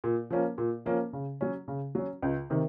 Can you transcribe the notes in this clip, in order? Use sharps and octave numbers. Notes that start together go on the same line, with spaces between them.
A#2
F3 A#3 C#4
A#2
F3 A#3 C#4
C#3
F#3 C#4
C#3
F#3 C#4
C#2
C3 D#3